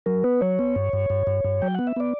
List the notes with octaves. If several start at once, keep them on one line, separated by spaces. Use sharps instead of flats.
F#3 A#4
B3 B4
F#3 C#5
B3
G2
G2
G2
G2
G2
F#3 G5
B3 F#5
E5
B3 D5